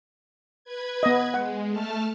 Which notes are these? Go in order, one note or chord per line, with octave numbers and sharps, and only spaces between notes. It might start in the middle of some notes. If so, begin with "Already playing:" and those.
B4 G#6
B3 D#5
G#3 F#5
A3 A5 F6